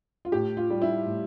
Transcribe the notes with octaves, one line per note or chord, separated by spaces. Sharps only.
F4
A2 G4
F4
G3
E4
A2